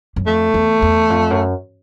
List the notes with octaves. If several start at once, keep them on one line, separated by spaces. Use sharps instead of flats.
F#2
F2 A3
E2
E2
F2
F#2